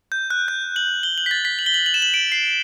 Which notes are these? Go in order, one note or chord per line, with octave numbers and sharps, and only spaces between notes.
G6
F#6
G6
F#7
G7
F#7
B6
A6
B6
F#7
G7
F#7
F#7
E7
F#7
D7
C7